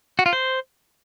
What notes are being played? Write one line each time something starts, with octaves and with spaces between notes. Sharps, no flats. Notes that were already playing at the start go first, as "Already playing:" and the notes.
F#4
F4
C5